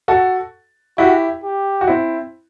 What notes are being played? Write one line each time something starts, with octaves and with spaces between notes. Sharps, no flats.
F#4 A4
E4 F#4 G4
G4
F#4
C4 E4